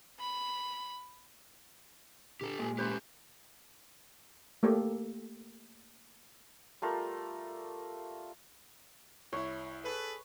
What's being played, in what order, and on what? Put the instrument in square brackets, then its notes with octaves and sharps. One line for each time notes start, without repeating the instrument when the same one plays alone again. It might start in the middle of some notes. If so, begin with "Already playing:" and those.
[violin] B5
[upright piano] D3 [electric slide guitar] G4 A4
[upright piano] A#2 [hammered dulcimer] G#3
[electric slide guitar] A3 C#4 G4 [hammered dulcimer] B4 C5
[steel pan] A3 A#3 G4 A4
[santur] G3 A3 F4 A#4
[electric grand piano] C2 E4 [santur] C#5
[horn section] G#4 A4 B4